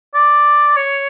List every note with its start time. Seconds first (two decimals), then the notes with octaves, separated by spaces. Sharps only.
0.14 D5
0.76 C#5